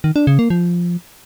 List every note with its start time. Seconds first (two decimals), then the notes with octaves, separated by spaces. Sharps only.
0.04 D#3
0.16 D4
0.27 C#3
0.39 A#3
0.50 F3